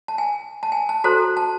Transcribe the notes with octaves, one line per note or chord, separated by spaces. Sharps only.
A5
G#5
A5
G#5
A5
F#4 A4 C5 A#5
A5